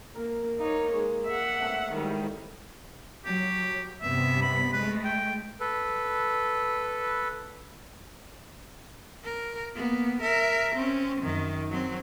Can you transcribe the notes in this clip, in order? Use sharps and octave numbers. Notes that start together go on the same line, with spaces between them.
A#3 A#4
A#3 D#4 C#5
G#3
E5 F#5
A3 C4 C#5
G#2 D#3 G3 E4
F#3 G4
G2 C3 B3 E5
B5
G#3 A3 B4
G5
A4 B4
A#4
A#3 B3
A#4 E5
C4 C#4
F#2 D#3
F#3 C4